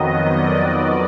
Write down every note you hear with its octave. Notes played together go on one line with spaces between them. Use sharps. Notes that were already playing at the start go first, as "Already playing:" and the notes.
Already playing: F2 D#3 F#3 B3 D#5
D5